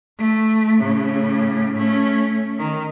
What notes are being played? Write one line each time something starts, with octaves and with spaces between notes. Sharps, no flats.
A3
A2 C#3
A3 C#4
D#3